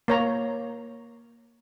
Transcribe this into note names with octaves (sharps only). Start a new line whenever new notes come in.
A#3 C#5 A#5